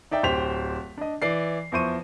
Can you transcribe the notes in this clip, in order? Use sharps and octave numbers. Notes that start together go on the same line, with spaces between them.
D#4 D5 E5 G5
D1 G4 C5 G5 B6 F7
D4 D#5
E3 D5 C7
E2 F3 E4 C5 C#6 D#7